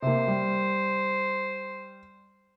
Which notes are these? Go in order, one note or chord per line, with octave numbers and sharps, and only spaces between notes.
C3 A#3 C5
G3